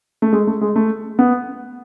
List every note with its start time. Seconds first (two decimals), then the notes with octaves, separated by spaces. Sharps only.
0.22 A3
0.33 G#3
0.47 A3
0.61 G#3
0.76 A3
1.19 B3